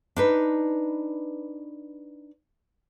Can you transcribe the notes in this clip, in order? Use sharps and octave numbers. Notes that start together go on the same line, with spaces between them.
D4 D#4 B4